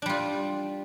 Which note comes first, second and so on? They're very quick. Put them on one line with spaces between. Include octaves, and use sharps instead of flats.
D4 G3 F4